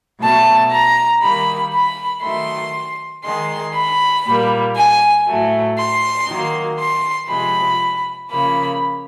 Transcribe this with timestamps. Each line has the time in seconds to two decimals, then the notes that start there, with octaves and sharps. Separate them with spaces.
0.20 B2 F#3 A3 A5
0.71 A#5
1.22 D#3 G3 A#3 B5
1.72 B5
2.24 D#3 F#3 A3 C6
3.24 D#3 G#3 C6
3.74 B5
4.25 A#2 G3 A#3
4.76 G#5
5.26 A2 F#3 A3
5.77 C6
6.28 D#3 F#3 A#3
6.79 C6
7.29 C3 F3 G#3 B5
8.30 C#3 F3 A#3 B5